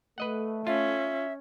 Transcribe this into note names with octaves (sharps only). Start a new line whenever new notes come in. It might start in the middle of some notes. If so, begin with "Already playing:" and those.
A3 B4 D#5 F#5
C#4 F4 E5